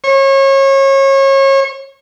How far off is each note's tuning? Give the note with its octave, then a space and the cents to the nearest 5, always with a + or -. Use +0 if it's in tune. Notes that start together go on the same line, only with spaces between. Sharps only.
C#5 -30